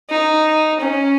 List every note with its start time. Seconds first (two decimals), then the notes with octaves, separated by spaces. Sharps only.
0.10 D#4
0.80 C#4